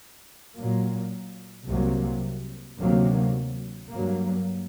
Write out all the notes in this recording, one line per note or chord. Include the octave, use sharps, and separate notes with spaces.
A#2 F#3 A#3
C2 C3 F#3 A#3
D2 C3 D#3 F#3 A#3
G2 F#3 A#3